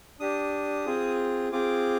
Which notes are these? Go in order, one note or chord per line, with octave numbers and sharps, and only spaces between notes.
D4 G4 D#6
C4 F4 G#4
C4 F4 G#4 D6